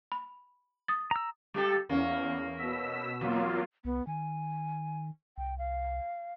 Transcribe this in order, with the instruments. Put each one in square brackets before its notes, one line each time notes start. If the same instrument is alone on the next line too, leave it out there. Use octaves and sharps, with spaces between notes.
[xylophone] B5
D#6 A6
[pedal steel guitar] A#5 E6
[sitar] G3 G4 A4
[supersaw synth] E2 [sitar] A#3 C#4
[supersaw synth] B2 E6 B6
[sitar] E2 [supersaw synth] F#3 A#3 F4
[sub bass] C2 [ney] B3
[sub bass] D#3 [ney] G#5
[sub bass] C2 [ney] G5
[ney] F5